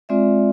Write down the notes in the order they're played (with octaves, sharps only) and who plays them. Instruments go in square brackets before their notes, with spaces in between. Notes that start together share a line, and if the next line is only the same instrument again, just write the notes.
[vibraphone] G#3 C4 F4 D5 E5